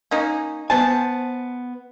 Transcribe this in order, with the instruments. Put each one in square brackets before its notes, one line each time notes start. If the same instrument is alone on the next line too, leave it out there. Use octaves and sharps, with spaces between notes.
[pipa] A#3 C#4 D#4
[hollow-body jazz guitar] B3 C5 G#5 [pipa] A5